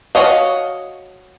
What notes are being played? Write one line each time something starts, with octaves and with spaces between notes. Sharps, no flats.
F#4 A#4 C#5 D#5 F5